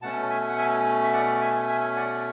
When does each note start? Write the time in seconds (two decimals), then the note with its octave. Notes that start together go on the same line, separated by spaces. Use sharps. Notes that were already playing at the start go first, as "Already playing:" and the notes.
0.02 B2 A3 C#4 F#5 A5
0.30 E5 G#5
0.49 F#5
0.58 E5 G#5
1.03 E5
1.13 D5 F#5
1.41 E5 G#5
1.69 E5 G#5
1.96 D5 F#5